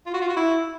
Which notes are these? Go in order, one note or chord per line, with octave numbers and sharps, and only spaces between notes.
F4
F#4
F4
F#4
E4